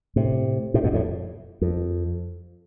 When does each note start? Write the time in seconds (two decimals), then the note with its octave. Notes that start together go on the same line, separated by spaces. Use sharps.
0.16 A2 C3
0.74 A2 C3
0.84 G2 B2
0.93 F2 A2
1.61 F2